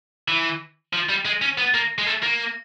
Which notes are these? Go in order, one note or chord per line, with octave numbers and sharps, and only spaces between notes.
E3
F3
G3
G#3
C#4
B3
A#3
G#3
A3
A#3